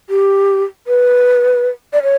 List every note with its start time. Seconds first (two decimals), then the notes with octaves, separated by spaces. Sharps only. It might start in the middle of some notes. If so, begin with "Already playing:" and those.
0.10 G4
0.87 B4
1.93 D5
2.03 C#5